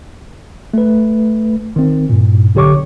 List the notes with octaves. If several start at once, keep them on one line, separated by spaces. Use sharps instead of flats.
A3 B4
D#3 C4
G2 A#2
B1 D3 G4 C#5 C#6 D6